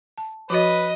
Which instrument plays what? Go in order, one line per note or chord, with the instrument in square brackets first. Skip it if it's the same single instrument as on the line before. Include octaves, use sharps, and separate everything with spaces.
[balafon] A5
[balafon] F3 F#4 C#5 [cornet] B4 [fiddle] D#5